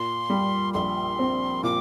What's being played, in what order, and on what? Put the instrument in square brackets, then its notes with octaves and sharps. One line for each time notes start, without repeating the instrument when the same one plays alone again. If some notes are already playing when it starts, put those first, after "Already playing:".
Already playing: [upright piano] A#2 [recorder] C6
[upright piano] G3
[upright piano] A#1 [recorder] C6
[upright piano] C4
[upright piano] A#2 [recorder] D6